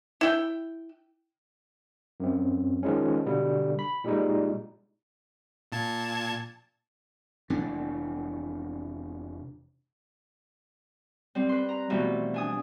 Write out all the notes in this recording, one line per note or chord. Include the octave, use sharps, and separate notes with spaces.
E4 G5
F#2 C4
D#3 F3 G#3 C#4
B2 D3 G3
B5
A#2 G3 G#3 D#4
A#2 A5 G#6
F1 E3 D4
G3 C4
B4 C6
A#5
B2 E3 F3 G3 A3 B3
D4 G#5 D#6